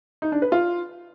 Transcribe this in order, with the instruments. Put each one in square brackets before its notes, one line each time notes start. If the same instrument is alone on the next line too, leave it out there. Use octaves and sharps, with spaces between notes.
[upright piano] D#4
D4
B4
F4